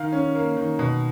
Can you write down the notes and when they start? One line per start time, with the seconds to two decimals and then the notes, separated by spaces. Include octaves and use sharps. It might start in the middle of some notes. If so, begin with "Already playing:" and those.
Already playing: D#3 D#4 F5
0.12 C#4
0.35 A#3
0.57 D#3
0.79 B2